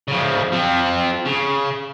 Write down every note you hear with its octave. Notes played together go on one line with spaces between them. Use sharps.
C#3 F3
F3 C4
C#3